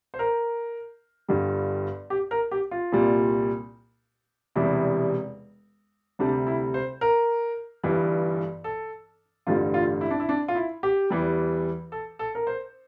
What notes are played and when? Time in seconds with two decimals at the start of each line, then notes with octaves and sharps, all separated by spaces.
0.14 C5
0.19 A#4
1.28 G1 G2 D3 G3
2.10 G4
2.31 A#4
2.51 G4
2.71 F4
2.92 C2 A#2 G3
4.55 E1 E2 C3 G3 E4
6.19 D2 C3 G3 D4
6.47 E4
6.74 C5
7.01 A#4
7.83 G1 G2 E3 G3
8.64 A4
9.47 A1 G2 D3 G3 F4
9.74 F4
10.01 E4
10.11 D4
10.20 E4
10.29 D4
10.48 F4
10.55 E4
10.83 G4
11.10 E2 E3 G3
11.92 A4
12.19 A4
12.35 A#4
12.47 C5